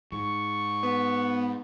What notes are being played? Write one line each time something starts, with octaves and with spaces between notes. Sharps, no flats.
G#2 C#6
B3